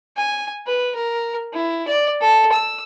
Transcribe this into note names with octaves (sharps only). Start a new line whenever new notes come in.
G#5
B4
A#4
E4
D5
A4
E6